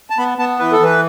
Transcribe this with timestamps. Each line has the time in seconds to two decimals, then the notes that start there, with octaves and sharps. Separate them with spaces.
0.10 A5
0.18 B3 B5
0.38 B3 A5
0.59 E3 B4
0.72 A4
0.80 E3 B4